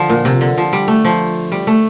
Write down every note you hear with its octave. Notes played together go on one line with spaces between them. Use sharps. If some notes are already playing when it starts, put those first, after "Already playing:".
Already playing: D3 F3
A#2
C3
D3
F3
G3
A3
F3
G3
A3